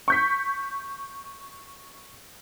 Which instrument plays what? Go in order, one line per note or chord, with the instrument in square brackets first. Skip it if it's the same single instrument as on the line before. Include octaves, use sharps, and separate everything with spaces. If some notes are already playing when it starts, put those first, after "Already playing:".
[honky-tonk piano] C#6 G6 B6